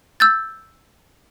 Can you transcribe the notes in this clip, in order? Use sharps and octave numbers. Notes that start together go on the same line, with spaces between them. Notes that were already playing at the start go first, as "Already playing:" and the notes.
E6 G6 A6